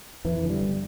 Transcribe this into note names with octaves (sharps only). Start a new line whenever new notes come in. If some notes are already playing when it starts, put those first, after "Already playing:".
F2 E3
D3
G3
G1